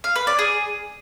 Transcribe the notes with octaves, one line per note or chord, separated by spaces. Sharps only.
F5
B4
D5
G#4